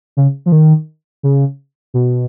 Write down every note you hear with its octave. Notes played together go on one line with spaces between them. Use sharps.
C#3
F3
D#3
C#3
B2